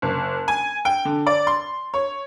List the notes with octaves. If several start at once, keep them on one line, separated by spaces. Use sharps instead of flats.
F#1
G#5
G5
D3
D5
C6
C#5